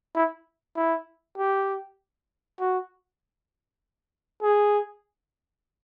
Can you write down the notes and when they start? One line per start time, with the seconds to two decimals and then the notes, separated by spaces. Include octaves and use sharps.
0.15 E4
0.76 E4
1.38 G4
2.60 F#4
4.42 G#4